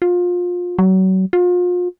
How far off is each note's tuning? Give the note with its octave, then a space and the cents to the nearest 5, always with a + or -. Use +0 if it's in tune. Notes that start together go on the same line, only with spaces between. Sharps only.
F4 +25
F#3 +30
F4 +35